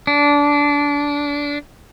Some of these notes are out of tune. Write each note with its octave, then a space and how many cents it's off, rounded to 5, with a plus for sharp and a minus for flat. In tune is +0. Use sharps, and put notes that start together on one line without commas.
D4 -20